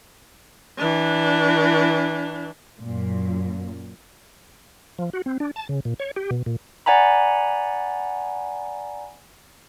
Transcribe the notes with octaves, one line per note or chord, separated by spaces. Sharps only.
E3 D4
F#2 A#2
F3
F#4
C4
D4
A5
C#3
A#2
C#5
G4
B2
A#2
D5 F#5 G#5 A#5 B5